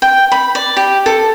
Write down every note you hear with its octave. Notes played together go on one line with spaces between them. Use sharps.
G5
B5
D5
G4
A4